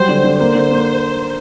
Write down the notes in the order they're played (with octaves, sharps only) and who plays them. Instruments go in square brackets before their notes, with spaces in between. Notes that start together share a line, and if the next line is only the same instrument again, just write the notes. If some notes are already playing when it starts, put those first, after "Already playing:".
Already playing: [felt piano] F#3 G3 [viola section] C5
[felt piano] D3
D3
[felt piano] A#3 [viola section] C5
[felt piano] D3
A#3